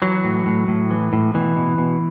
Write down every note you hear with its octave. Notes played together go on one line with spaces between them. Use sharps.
E3 F#3
A2
A2
A2
E3
A2
B2 E3
B2
B2